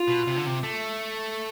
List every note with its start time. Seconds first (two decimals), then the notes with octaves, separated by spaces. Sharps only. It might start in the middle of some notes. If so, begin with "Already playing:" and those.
Already playing: F4
0.08 B2
0.28 C3
0.37 D3
0.46 C3
0.63 A3